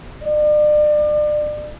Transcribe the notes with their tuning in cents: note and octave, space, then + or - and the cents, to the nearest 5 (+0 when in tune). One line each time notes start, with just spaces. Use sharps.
D5 +35